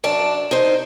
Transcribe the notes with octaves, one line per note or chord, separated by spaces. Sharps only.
F#2 D4 D5 A5
D#4 C5